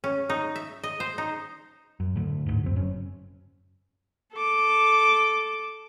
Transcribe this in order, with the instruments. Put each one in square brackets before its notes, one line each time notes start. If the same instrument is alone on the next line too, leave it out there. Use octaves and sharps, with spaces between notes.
[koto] C#4
D#4
E5
D#5
C5
D#4
[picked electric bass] F#2
D2 A2
D2 G#2
F#2 C4
F#1 F#2 C#4
[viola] A4 D6